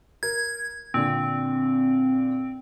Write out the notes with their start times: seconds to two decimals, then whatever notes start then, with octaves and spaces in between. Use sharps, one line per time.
0.23 A#4 G#6
0.94 A#2 D3 C4